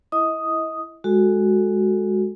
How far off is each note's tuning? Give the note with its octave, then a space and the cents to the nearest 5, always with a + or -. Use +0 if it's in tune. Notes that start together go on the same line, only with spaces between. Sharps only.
E4 +0 D#5 +30 D#6 +0
G#3 +0 F#4 +0 A4 +0